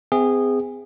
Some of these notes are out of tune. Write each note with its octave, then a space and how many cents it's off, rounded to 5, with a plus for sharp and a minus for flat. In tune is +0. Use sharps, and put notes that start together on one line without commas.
C4 -40 G#4 -15 E5 -10